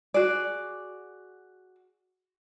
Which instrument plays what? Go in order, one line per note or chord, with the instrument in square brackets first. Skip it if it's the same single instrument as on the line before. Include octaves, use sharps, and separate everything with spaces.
[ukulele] F#4 G#4 D5